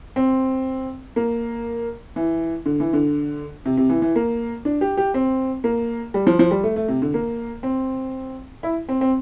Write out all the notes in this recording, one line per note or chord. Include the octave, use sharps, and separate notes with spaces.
C4
A#3
E3
D3
E3
D3
C3
C3
E3
E3
A#3
D4
G4
G4
C4
A#3
G3
F3
F3
G3
A3
A3
C3
D3
A#3
C4
E4
C4
C4